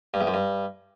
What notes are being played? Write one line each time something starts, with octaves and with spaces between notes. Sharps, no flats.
G2
E2
F#2
G2